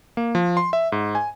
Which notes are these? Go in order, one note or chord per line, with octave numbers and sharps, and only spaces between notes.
A#3
F3
C6
E5
G#2
G#5